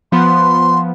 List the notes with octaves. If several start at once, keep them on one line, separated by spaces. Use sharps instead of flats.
F3 B3 C6